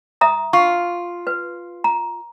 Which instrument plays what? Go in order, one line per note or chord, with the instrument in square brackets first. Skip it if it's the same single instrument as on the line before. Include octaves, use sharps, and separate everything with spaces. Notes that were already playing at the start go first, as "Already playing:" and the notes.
[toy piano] E5 A#5 D#6
[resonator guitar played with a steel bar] F4 [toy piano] C#6
[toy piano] B4
A#5